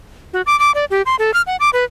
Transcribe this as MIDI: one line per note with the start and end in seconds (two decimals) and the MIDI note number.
0.33 0.42 66
0.46 0.58 86
0.59 0.71 86
0.75 0.85 74
0.91 1.02 67
1.06 1.16 84
1.19 1.34 69
1.34 1.42 89
1.47 1.56 78
1.60 1.70 86
1.73 1.84 71